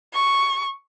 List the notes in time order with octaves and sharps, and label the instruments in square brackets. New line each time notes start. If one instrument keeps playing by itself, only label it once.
[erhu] C#6